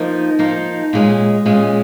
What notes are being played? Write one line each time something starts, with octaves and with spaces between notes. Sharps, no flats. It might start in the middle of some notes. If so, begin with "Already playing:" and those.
Already playing: F3 A#3 D#4
F3 A#3 D#4
A#2 G#3 C#4
A#2 G#3 C#4